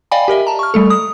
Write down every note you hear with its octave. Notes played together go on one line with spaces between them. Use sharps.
D5 D#5 F5 G5 G#5 B5
G4 A#4 D#5 E5
A5 A#5
C#6 F6
G3 A3 A4
D#6